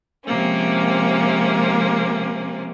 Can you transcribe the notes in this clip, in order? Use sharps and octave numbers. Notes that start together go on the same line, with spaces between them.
C3 F3 G#3 A#3 C4 C#4